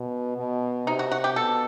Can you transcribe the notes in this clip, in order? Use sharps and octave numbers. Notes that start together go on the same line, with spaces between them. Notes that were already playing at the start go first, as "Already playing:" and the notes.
Already playing: B2
B2
C3 D#4
F#4
F#4
G4
B2 A4